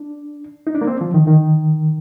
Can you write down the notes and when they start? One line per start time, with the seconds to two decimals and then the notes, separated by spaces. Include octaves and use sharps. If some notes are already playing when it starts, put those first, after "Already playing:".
Already playing: D4
0.67 D#4
0.74 D4
0.81 A#3
0.87 C4
1.01 F3
1.14 D#3
1.27 D#3